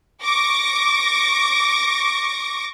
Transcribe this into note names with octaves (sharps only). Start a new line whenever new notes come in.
C#6 D6 A#6